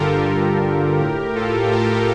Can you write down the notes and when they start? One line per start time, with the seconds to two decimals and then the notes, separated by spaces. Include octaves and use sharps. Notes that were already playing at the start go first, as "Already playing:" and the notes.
Already playing: G2 D3 F4 G4 A4 A#4
0.29 F4 A4
0.99 A2 G4 A#4
1.35 F4 A4
1.71 G4 A#4